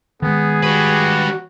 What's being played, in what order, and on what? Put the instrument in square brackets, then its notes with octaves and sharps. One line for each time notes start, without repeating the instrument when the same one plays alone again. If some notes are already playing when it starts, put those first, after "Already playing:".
[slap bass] D#3 G#3 [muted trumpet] B3 [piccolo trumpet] G#4
[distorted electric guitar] G3 B4 [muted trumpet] F#4